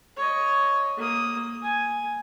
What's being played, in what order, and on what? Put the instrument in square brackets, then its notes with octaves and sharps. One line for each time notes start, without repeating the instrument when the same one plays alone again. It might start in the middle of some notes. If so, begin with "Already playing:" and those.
[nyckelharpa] C#5 D#5
A#3 D#6
G#5